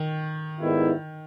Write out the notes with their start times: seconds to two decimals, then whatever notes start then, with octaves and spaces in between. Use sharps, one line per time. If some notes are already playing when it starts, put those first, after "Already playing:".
Already playing: D#3
0.60 G#2 D#3 G3 B3 E4